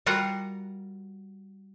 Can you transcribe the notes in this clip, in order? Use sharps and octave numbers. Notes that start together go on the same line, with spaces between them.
G3 F4 F#4 A#4 F#5 A#5